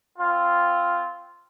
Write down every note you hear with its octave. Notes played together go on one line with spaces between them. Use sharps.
C4 F4